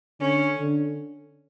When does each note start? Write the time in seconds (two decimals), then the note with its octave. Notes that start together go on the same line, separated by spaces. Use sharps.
0.20 D3 C#4
0.58 D3